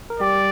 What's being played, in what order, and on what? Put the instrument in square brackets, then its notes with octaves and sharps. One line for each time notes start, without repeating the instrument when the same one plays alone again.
[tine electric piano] A#4
[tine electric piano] G3 G4 [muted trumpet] D5